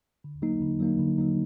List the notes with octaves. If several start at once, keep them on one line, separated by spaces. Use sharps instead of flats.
D3
F#3 A#3 D#4
D3
F#3 A#3 D#4
D3
F#3 A#3 D#4